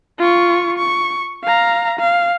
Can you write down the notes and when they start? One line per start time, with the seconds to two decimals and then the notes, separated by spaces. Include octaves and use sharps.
0.19 F4 C#6
0.78 C#6
1.44 F5 A#5
1.99 F5